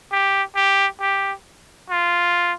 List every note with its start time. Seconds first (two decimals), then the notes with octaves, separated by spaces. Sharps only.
0.12 G4
0.56 G4
1.01 G4
1.90 F4